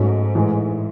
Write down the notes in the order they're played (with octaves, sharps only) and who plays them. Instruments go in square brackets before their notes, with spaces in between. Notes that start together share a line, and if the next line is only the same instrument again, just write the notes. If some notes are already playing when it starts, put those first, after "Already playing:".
Already playing: [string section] G#2 [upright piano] F#3 A3 C#4
[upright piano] A2 E3 G#3